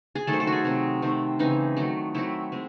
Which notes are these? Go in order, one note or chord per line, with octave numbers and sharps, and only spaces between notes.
G#4
D#3 F#3 A3 A4
C5
A4
F#4
G#4
C3 F#3 C4
D#3 A3 C4
C#3 E3 C4 D#4
D#3 F#3 A3
D#3 F#3 A3 C4 E4
G#3 C4